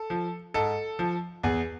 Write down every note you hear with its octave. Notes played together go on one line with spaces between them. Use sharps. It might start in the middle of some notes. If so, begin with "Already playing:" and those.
Already playing: A4
F3
G#2 A4
F3
E2 G#4